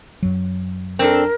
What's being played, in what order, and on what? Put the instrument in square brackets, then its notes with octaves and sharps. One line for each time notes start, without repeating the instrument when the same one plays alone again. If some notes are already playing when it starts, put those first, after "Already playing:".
[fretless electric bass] F#2 F#3
[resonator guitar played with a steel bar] C4 D4 A4 [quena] A#4